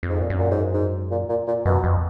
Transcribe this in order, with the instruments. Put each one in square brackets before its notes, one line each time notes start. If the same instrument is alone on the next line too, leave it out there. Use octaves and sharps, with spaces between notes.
[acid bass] F2
[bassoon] G#2
A#2
[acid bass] F#2
[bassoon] A#2
G#2
G#2
A#2
A#2
A#2
[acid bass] F#2 [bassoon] B2
[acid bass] F2